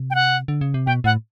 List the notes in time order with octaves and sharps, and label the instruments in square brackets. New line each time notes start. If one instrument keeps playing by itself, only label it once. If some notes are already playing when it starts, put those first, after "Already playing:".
Already playing: [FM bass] C3
[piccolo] G5
F#5
[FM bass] D3
C#3
C3
[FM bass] B2 [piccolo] G5
[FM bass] A2 [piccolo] F#5